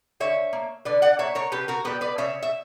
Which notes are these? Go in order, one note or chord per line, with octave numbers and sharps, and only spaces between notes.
D3 C#5 E5
A#3
D3 B4 D5
D5 F#5
A#3 C#5 E5
A#4 C#5
C#3 G4 B4
F#4 A#4
G3 B3 G4 B4
B4 D5
C#3 C#5 E5
E5